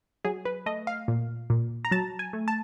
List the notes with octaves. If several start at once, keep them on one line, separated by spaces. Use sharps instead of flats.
F#3 G#4
B4
A3 D#5
F5
A#2
A#2
A#5
F#3 A5
G#5
A3
A5